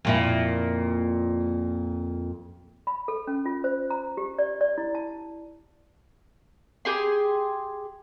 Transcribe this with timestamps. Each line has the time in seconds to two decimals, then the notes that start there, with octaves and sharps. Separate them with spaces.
0.05 F2 A#2 E4
2.87 B5
3.08 A4
3.27 C#4
3.46 F4
3.64 C5
3.90 A#5
4.17 G4
4.39 D5
4.61 D5
4.78 E4
4.95 A5
6.85 G4 G#4 C6